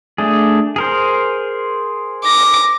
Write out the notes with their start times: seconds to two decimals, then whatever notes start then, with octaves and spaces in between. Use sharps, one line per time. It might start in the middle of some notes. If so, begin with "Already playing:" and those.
0.18 A3 D4 G#4
0.76 G#4 A#4 C5
2.24 D6 A#6